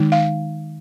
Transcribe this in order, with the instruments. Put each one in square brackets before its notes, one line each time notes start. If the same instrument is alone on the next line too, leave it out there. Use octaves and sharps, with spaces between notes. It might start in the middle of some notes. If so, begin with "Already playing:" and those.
Already playing: [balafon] D#3 G#3 D#4
F5